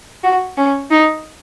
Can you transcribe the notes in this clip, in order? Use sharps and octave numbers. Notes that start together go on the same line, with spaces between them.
F#4
C#4
D#4